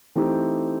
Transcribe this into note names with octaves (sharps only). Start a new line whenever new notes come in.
E3 A3 C4 D#4 G4